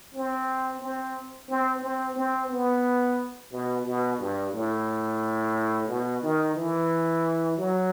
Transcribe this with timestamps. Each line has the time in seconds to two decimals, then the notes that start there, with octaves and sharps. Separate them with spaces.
0.13 C4
0.81 C4
1.49 C4
1.82 C4
2.16 C4
2.50 B3
3.51 B2
3.85 B2
4.18 G2
4.52 A2
5.88 B2
6.22 D#3
6.55 E3
7.57 F#3